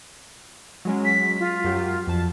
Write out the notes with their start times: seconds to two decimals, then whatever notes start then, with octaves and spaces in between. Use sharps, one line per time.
0.85 F#3 G#3 C#4
1.05 B6
1.40 F4
1.64 F#2 F#3 G4
2.07 F2 A5